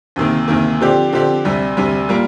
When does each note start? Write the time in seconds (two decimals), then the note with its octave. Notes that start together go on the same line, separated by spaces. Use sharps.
0.16 D2 C3 D#3 A#3
0.48 D2 C3 D#3 A#3
0.81 D3 F3 C4 G4 D5
1.12 D3 F3 C4 G4 D5
1.45 D2 C3 G3
1.77 D2 C3 G3
2.09 G3 A#3 F4